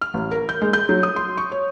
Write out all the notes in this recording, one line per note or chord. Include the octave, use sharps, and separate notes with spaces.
F6
A1
A#4
G6
G#3
G6
F#3
D#6
C6
C#6
C#5